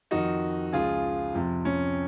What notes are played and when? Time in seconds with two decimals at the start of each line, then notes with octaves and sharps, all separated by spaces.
0.11 F2 D#3 D#4 F#4
0.73 C#2 C#3 F3 F4 G#4
1.34 F2 C3 F3
1.65 C#4